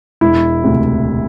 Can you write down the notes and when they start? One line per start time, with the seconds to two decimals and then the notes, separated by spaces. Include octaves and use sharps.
0.21 E1 E4
0.64 D2 C3